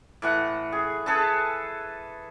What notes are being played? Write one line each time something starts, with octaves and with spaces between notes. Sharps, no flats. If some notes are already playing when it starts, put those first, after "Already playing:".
A2 E3 F#5
G#4
G#4 A4 B4 A5